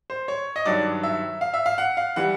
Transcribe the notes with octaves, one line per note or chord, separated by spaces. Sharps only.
C5
C#5
D#5
G2 D#3 F#3 D5
E5
F5
E5
F5
F#5
F5
E3 G3 F#5